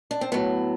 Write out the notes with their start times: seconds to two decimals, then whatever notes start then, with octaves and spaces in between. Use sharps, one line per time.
0.11 D4
0.21 C4
0.32 A2 F#3 B3